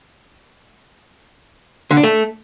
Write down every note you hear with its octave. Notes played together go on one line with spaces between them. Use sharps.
D3
D4
A3